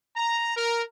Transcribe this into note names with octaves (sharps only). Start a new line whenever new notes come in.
A#5
A#4